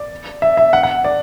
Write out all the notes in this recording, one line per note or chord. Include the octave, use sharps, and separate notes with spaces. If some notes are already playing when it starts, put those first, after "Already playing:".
Already playing: D5
E5
E5
F#5
F#5
D5